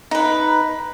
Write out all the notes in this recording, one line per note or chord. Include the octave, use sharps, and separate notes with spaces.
D#4 B4